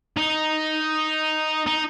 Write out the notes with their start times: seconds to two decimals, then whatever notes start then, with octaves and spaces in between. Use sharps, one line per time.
0.17 D#4
1.67 D#4